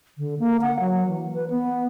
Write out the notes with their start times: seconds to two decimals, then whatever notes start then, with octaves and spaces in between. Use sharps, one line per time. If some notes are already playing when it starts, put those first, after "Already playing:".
0.18 D3
0.39 A#3
0.62 F#5
0.80 F#3
1.08 E3
1.34 B4
1.50 B3